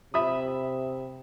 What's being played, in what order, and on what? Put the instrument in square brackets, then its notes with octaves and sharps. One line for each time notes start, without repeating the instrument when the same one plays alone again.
[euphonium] C3 [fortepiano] E5 B5 D#6